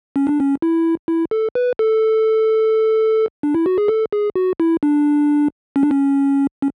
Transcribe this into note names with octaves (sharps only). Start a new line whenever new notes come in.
C#4
D4
C#4
E4
E4
A4
B4
A4
D4
E4
F#4
G#4
A4
G#4
F#4
E4
D4
C#4
D4
C#4
C#4